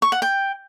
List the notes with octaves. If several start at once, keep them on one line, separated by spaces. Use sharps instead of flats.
C#6
F#5
G5